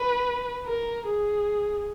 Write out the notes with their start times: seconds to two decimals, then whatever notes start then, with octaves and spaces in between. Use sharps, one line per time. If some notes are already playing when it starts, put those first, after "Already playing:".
Already playing: B4
0.66 A#4
1.06 G#4